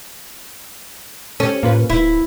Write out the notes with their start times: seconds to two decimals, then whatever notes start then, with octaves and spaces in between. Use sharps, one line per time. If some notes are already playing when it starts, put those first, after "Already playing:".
1.40 C#4 G4 A4
1.63 A2 A#3 F4 B4
1.90 D1 E4